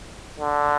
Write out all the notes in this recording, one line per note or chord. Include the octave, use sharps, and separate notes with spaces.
D3